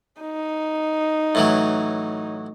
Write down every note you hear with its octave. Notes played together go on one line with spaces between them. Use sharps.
D#4
A2 E3 F#3